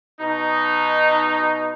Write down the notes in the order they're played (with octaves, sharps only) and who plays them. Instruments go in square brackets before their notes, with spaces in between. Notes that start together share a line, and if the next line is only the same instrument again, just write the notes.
[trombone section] B2 D#4